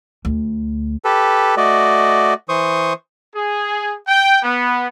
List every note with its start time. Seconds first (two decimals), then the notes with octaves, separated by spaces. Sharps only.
0.25 D2
1.05 G4 A4 B4
1.57 A3 F#4 D5 D#5
2.49 E3 C5 C#6 D#6
3.35 G#4
4.08 G5
4.43 B3